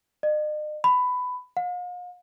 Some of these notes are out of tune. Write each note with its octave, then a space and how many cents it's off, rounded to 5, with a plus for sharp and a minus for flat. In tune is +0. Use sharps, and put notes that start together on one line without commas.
D#5 -45
B5 +15
F5 +40